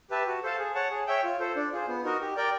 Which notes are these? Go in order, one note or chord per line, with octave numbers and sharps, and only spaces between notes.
G4 B4 E5 A5
F#4
A4 C5 F5 A5
G#4
C#5 F#5 A5
G#4
C#5 E5 G5
F4
A4 C5
D4
F4 G#4 C5
B3
D#4 F#4 A#4 D#5
G4
A#4 D5 G5